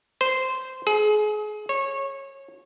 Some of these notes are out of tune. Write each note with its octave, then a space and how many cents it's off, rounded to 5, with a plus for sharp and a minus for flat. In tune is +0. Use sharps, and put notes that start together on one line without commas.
C5 -10
G#4 +30
C#5 -20